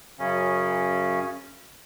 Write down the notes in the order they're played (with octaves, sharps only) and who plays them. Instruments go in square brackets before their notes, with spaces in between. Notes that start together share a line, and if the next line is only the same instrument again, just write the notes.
[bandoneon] F#2 C#3 C#4